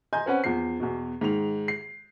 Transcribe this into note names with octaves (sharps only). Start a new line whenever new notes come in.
D#5 G#5 A#5 C6 G6
C4 C#4 B4 F#5
E2 F3 C7
E2 B2
G#2 D#3 F7
C7